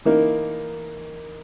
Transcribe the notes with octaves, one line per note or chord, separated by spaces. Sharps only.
E3 A#3 D#4 A#4